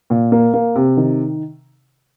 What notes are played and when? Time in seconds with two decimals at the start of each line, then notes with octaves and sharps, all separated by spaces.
0.10 A#2
0.32 A#3
0.54 A#3
0.75 C3
0.97 D#3